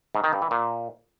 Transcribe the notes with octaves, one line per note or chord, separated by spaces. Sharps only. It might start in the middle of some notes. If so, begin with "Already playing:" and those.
G#2
D#3
G2
E3
A#2